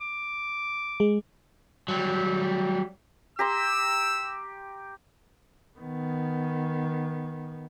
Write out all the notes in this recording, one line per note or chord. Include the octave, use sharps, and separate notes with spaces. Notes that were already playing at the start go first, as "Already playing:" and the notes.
D6
G#3
F#3 G3
G4 A#5 C6 E6
D#3 B3